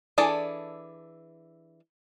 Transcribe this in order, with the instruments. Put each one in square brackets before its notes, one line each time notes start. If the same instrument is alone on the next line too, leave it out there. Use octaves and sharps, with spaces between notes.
[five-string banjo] E3 D4 G#4 A4 D5